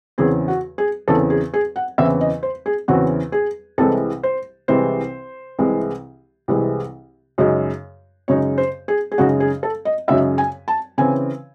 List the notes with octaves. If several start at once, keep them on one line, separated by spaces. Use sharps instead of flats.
E2 C#3 E3 C4 G#4
F#4
G#4
E2 C#3 E3 C4 A4
G#4
G#4
F#5
E2 C#3 E3 C4 E5
D#5
C5
G#4
E2 C#3 E3 C4 F#4
G#4
C2 C3 E3 G#3 A4
C5
C2 C3 E3 G#3 C5
C2 C3 E3 G#3
C2 C3 E3 G#3
F#2 C#3 G#3 D#4
F#2 C#3 G#3 D#4 C#5
C5
G#4
G#4
F#2 C#3 G#3 D#4 F#4
G#4
A4
D#5
F#2 C#3 G#3 D#4 E5
G#5
A5
C#3 E3 C4 G#5